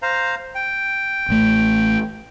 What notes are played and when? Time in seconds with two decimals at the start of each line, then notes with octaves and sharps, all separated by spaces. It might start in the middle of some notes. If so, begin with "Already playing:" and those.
0.02 C5 F5 A#5
0.55 G5
1.29 A1 A3